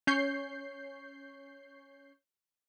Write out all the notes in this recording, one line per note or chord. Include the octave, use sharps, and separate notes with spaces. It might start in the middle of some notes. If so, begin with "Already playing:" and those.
C#4 C#5 G6 C7